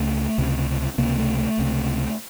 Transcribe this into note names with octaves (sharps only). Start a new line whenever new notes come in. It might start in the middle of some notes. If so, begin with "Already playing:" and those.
Already playing: C#2 A3
C#2 C3
C#2 C3 A#3
A3
A3
C#2 C3